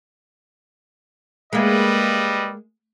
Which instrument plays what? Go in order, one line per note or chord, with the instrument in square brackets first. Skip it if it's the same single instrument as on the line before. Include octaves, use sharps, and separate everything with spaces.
[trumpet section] G3 B4 D#5 [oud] G#3 A#3